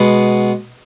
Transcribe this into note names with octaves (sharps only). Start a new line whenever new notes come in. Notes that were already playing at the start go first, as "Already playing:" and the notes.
Already playing: B2 G#3 B3